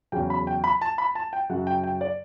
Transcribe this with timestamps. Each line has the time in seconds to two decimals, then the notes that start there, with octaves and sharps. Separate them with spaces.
0.12 E2 C#3 F#3 G5
0.30 B5
0.47 G5
0.64 B5
0.81 A5
0.98 B5
1.15 A5
1.33 G5
1.50 F#2 C#3 F#3 F#5
1.67 G5
1.84 G5
2.01 D5